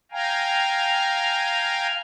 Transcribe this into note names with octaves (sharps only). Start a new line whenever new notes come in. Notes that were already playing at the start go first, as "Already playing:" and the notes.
F5 G5 G#5 A#5